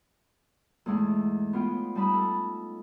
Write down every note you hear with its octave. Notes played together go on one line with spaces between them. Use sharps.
E2 G#2 G#3 A3
B3 C#4 F4 G5
G3 D#4 A5 B5 D#6
A4